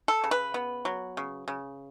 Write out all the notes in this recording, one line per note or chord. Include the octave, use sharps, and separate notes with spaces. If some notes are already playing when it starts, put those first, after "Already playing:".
A4
C#3
B4
B3
F#3
C#3
C#3